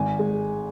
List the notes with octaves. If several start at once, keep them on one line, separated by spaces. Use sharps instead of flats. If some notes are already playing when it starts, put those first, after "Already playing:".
Already playing: G#1 G#5
G#3